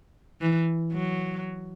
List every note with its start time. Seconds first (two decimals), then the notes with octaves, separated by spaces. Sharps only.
0.41 E3
0.93 F#3